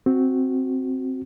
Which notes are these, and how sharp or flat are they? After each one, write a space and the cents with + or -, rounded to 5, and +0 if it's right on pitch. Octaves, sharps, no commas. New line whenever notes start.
C4 +0 F#4 +0